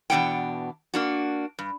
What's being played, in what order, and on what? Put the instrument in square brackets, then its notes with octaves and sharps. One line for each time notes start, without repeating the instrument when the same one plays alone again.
[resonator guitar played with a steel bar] E2 B2 C#4 D4 F#5 G5
A#3 D4 F#4
G2